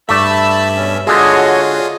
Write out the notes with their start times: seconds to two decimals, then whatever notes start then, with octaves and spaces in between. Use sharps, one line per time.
0.09 G2 A3 D5 E5 A5 B5 E6
0.76 B2 C#4
1.07 D3 G#3 F4 F#4 G#4 C#5 D#5